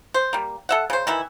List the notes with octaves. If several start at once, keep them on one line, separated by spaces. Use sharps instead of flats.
C5
G3 A#3
A4 E5 F#5
C#3 C5
D#3 E3 E4